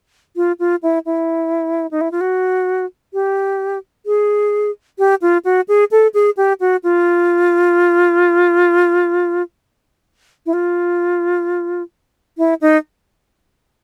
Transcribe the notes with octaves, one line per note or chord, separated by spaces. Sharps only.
F4
F4
E4
E4
D#4
E4
F4
F#4
G4
G#4
G4
F4
F#4
G#4
A4
G#4
G4
F#4
F4
E4
F4
E4
D#4